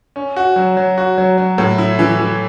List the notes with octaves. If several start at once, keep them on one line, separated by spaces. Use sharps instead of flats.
C#4
F#4
F#3
F#3
F#4
F#3
F#3
A2
E4
E3
E3